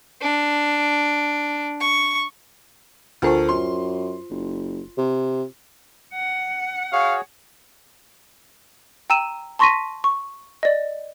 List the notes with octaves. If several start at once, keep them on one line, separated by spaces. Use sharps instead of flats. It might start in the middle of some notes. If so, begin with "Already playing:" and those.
D4
C#6
D2 F4 A4 A#4 C5 C#6
F#2 C6
F#1
C3
F#5
F#4 G#4 C#5 F5
G5 A#5 E6 D#7 E7
A5 C6 C#6 A#6 B6 D#7
C#6
D5 D#5